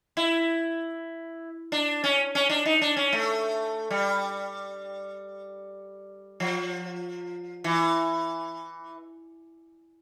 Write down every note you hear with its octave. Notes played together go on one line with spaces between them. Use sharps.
E4
D4
C#4
C#4
D4
D#4
D4
C#4
A3
G3
F3
E3